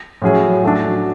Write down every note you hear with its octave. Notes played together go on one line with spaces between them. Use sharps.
A2 F#3 C#4 G#4
F#3 A3 D4